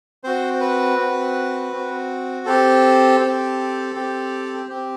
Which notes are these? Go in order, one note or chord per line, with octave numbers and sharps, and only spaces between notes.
C4 F#4 C5
B4
C4 F#4
C4 F#4
C4 G4 A4
C4 G4
C4 G4
C4 G4